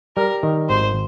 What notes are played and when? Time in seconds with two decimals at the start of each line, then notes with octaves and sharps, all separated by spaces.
0.16 G3 A#4
0.43 D#3
0.69 G#1 C5